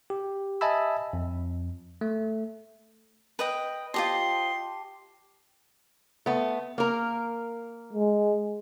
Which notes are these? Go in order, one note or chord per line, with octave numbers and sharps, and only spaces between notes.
G4
D#5 E5 G#5 A5 B5 E6
F2
A3
B4 D#5 G5
F4 G4 C5 D#5 A5 C6
A3 B3
A#3 A#4
G#3